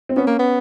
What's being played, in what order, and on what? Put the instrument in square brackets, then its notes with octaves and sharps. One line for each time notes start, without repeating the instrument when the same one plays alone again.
[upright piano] C4
[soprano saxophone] B3 [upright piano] C#4
[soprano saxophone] A#3
B3